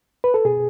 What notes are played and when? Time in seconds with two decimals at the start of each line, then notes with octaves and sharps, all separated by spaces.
0.24 B4
0.34 A4
0.45 B2 G#4